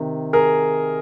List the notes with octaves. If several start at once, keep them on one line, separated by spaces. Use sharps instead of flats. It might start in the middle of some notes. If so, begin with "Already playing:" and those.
Already playing: C3 D#3
G#4 A#4